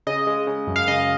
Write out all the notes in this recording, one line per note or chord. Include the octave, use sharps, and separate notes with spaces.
C#3 D#5
G#3
C#3
F#2
F5
C#3 D#5